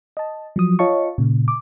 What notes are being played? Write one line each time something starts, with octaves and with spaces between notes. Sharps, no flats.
D#5 A5
F3 F#3 D#6
F4 C#5 D#5 F5 A5 C#6
A#2 C#3
D6